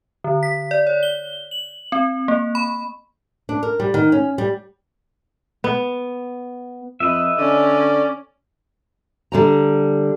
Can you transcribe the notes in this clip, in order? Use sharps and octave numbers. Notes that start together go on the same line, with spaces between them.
D3
B6
D5
C#5
G7
F#7
C4
A#3
B5
D4
A#4
G3
D#3
C#4
G3
B3
F2 B4 D#5 E5
D3 C#4 D5
D3 G3 A#5